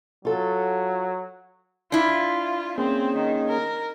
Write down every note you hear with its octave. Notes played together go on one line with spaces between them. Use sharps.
F#3 F4 A4
D4 E4 F4
A#3 C4 C#4 G#4
D#3
A#4